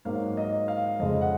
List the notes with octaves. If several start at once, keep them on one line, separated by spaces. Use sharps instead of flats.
G#2 F#3 A#3 F5
D#5
F5
F2 C#3 G#3 D#5
F#5